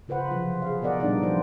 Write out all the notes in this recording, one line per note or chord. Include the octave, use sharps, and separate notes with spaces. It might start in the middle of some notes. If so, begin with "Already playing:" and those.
C#3 F4 B4 C5 F#5
C3 F3 F#3 F4
G#4 F5
B2 B3 A#4 D5 D#5 F#5
A#2 G3 B3 D4 D#4 D5
E3 F3 C#4 D#4 F4 C5